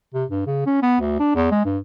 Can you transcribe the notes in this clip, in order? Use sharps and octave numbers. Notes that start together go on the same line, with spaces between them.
C3
G2
C#3
C#4
B3
D2
D4
E2
G#3
G2